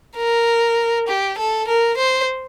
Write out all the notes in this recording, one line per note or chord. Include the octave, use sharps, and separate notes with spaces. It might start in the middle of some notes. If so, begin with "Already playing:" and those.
A#4
G4
A4
A#4
C5